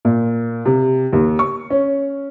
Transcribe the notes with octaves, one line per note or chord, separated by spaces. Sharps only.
A#2
C3
D#2
C#6
C#4